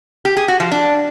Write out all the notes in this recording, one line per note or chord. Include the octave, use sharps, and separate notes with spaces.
G4
G#4
F#4
F3
D4